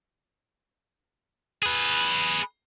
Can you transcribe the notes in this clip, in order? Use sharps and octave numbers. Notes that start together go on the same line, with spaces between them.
G#4 B4